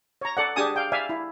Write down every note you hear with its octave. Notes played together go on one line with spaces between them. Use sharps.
C#5 A#5
A4 D5 F#5
D4 G4 G#4 G#5 A5 D#6
F5 G5
D5 E5 F5 G#5
E4